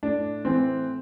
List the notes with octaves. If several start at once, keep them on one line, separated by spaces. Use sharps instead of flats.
A2 D4
E3 C4